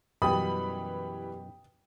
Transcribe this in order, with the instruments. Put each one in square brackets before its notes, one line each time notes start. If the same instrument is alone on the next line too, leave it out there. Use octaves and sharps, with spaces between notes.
[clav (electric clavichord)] F#2 B2 [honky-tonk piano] E3 G3 B5 [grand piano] G5 D#6